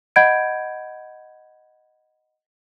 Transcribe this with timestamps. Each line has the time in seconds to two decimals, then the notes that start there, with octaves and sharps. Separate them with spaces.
0.16 D#5 F#5 B5 G6 G#6 D7